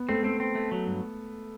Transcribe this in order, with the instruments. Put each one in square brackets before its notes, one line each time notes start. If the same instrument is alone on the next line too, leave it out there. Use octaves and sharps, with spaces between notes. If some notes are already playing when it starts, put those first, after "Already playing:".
Already playing: [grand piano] B3
[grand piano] A3 [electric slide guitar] C4
[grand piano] A3 [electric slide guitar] C4
[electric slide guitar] C4
A3
F#3
G2